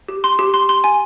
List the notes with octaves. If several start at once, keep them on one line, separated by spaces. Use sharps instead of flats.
G4
C6
G4
C6
C6
G#5